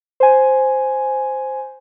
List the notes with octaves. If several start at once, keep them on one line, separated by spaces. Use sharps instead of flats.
C5 G#5